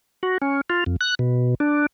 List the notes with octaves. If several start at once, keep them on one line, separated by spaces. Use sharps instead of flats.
F#4
C#4
F4
F2
F#6
B2
D4